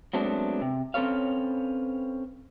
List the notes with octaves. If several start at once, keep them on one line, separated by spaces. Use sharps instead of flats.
F#3 G#3 A3 B3 C4 D4
C3
C4 C#4 A4 B4 C#5 F5